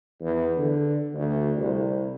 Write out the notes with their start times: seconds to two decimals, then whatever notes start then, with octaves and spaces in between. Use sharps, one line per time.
0.21 E2
0.57 D3
1.14 D2
1.57 C2